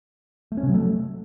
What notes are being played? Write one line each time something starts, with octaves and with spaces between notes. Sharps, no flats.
A3
C#4
C3
F#3
A3